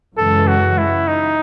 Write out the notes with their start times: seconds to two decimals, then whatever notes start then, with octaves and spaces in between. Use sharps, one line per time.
0.17 F#2 C#3 E3 G#3 C#4 A4
0.47 F#4
0.78 E4
1.07 D#4